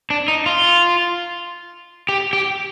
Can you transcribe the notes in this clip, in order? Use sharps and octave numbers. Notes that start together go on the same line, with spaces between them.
D4
D#4
F4
G4
G4